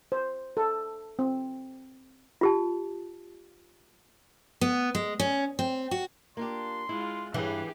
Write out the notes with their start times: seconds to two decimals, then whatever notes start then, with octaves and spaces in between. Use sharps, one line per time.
0.12 C5
0.57 A4
1.19 C4
2.41 F4 G4 A5
4.61 B3
4.95 G#3
5.20 C#4
5.59 C4
5.91 F#4
6.37 A#3 D4 F4 G4 C6
6.89 G#3 E4 F4
7.34 G2 E3 G4 G#4